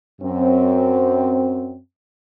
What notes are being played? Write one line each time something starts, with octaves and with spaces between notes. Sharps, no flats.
F#2 C4